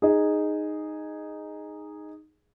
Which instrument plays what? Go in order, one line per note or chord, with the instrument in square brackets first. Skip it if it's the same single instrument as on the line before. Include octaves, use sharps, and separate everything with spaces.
[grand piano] D#4 G#4